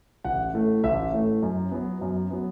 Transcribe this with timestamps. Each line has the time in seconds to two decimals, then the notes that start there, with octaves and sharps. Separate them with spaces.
0.24 A1 F#5
0.53 A2 A3
0.83 A1 E5
1.13 A2 A3
1.42 F#2
1.71 F#3 B3
2.01 F#2
2.31 F#3 B3